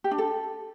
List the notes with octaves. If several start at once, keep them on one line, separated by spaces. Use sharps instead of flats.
G4
D4
A4